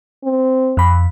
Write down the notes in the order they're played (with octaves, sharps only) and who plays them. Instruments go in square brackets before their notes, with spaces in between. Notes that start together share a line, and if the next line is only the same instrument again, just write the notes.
[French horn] C4
[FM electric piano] F2 B5